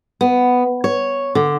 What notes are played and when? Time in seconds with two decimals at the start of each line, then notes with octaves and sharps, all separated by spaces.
0.21 B3
0.84 C#5
1.35 D3